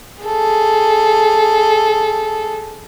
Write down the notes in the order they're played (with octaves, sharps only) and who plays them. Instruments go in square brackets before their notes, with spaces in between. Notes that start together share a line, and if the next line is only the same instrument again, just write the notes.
[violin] G#4 A4